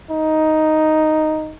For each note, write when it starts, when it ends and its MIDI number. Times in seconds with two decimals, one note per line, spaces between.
0.11 1.56 63